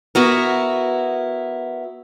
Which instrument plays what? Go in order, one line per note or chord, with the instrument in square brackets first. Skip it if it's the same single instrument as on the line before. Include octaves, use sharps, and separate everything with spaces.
[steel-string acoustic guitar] B3 E4 F#4 A#4